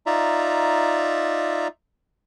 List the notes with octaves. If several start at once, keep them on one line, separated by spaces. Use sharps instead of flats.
D#4 F4 D5 E5 A#5